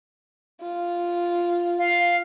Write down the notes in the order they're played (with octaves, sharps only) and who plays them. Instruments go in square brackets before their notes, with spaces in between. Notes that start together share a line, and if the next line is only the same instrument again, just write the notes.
[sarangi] F4
[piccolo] F5